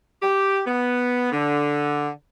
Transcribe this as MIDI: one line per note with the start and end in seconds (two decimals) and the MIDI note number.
0.22 0.61 67
0.67 1.32 59
1.32 2.10 50